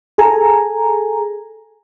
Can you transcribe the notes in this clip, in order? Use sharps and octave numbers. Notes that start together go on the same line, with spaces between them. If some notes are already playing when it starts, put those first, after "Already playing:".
G#4 A4 G#5 A#5